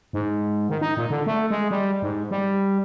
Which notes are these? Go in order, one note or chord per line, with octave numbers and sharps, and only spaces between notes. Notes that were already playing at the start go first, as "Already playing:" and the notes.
G#2
D#3
D#4
A#2
D3
A3
G#3
G3
G#2
G3